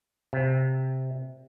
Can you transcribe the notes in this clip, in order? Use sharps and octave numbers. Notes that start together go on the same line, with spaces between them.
C3